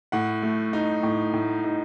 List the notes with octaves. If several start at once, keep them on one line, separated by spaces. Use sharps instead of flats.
A2 F#5
A3
D#4
A2
A2
D#4